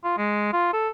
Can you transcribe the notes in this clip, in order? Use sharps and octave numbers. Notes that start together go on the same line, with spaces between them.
F4
G#3
F4
A4